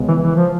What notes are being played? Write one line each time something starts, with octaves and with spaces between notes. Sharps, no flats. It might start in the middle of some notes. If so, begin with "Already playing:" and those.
Already playing: C#2 B2 G#3 B3
E3
E3
F3